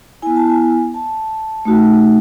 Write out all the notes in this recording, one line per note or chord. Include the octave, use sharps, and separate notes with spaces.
B3 E4 G#5
A5
G#5
A5
A3 D#4 F#4